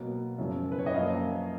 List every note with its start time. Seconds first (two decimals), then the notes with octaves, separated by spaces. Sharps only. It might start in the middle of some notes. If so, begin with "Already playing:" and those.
Already playing: B2 F#3 A#3
0.38 F#2 C#3 F3
0.72 B4
0.79 C#5
0.86 D#5
0.94 F#2 F3 A#3 F5